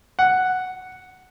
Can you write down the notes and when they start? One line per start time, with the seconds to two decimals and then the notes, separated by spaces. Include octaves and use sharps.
0.19 F#5